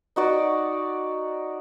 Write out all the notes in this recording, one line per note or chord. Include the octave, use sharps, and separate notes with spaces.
D#4 F#4 D5